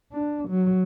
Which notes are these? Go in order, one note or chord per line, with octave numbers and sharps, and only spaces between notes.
D4
F#3